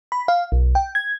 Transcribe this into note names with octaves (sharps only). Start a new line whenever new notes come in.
B5
F5
B1
G5
G#6